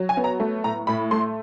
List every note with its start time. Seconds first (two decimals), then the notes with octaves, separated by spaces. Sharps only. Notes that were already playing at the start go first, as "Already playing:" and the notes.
Already playing: F#3
0.09 G#5
0.17 B3
0.24 A#5
0.40 A3
0.64 A2 A#5
0.87 A2 B5
1.11 A3 C6